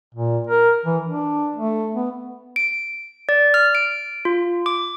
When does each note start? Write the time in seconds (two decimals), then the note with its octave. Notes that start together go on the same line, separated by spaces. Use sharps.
0.15 A#2
0.47 A#4
0.86 E3
1.06 D4
1.56 A3
1.95 B3
2.56 D7
3.29 D5
3.54 F6
3.75 D7
4.25 F4
4.66 D6